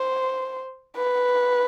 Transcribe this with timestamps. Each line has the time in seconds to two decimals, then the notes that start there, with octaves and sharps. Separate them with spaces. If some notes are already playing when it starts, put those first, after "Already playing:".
Already playing: C5
0.97 B4